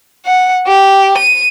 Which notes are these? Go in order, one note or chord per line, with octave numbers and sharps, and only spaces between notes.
F#5
G4
D#7